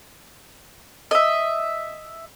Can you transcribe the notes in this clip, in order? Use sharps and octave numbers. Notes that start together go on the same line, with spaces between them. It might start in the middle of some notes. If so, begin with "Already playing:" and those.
D#5 E5